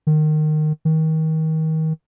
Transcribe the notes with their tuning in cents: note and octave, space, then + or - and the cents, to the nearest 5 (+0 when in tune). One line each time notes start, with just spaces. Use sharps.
D#3 -20
D#3 +30